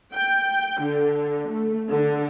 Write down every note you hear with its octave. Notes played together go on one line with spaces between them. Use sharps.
G5
D3
A3
D3